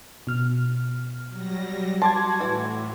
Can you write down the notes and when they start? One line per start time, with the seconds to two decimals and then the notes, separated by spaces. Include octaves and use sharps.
0.27 B2 F6
1.29 F#3 G3 A#6
2.02 F#4 A5 C6 D6 G#6
2.40 A2 E3